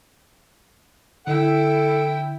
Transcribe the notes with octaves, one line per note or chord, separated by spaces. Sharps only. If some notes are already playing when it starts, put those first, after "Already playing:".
D3 E4 A4 G5